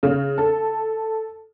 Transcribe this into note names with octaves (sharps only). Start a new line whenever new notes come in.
C#3
A4